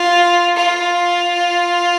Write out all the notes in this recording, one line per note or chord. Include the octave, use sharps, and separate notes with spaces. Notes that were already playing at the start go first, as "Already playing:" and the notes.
Already playing: F4
F4